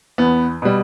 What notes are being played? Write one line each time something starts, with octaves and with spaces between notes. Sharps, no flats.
E2 B3
B2 G3